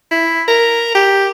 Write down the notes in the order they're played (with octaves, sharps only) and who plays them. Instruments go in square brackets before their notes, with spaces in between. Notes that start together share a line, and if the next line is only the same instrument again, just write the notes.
[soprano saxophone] E4
A#4
G4